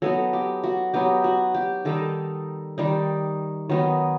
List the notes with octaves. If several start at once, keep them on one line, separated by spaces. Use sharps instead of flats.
F#3 B3 D#4 A4
G4
F#4
F#3 B3 D#4 G4
F#4
G4
D#3 G3 D#4 A4
D#3 G3 D#4
D#3 F#3 B3 D#4